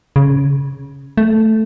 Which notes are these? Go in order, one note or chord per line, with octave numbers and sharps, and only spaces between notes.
C#3
A3